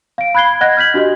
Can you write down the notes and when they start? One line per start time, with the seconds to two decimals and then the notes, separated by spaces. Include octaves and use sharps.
0.18 F5 D7
0.35 B5 F#6 G#6 C7 G7
0.61 D#5 F#5 F#6 G#6 A#6
0.77 F6 G6 B6 F#7
0.94 D4 F#4 G4 D#5